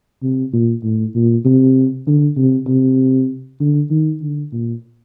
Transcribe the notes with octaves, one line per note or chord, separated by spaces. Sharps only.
C3
A#2
A2
A#2
C3
D3
C3
C3
D3
D#3
D3
A#2